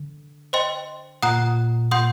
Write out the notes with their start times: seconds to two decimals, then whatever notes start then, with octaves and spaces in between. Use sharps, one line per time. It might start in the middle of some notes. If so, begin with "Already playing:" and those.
Already playing: D3
0.53 C5 D#5 G5 C6
1.23 A#2 F#5 A#5 D#6 F#6
1.91 A#2 F#5 C6 D#6 G6